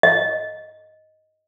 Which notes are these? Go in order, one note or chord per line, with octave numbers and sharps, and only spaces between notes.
D#5